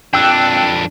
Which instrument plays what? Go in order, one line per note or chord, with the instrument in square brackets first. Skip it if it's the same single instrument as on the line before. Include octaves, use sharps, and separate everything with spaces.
[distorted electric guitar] F2 D4 [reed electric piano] G5 E6 F#6